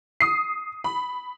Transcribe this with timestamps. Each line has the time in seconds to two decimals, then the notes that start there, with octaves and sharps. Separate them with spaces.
0.20 D#6 C7
0.84 B5